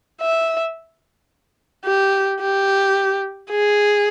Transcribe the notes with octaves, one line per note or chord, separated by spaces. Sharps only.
E5
G4
G4
G#4